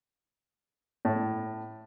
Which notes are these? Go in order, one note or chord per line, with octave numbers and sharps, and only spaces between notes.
A2